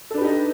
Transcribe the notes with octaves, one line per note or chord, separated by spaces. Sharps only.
D4 D#4 G4 A4 B4